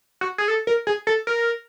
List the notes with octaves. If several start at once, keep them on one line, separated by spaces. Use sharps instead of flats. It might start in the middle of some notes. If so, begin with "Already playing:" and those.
F#4
G#4
A4
A#4
G#4
A4
A#4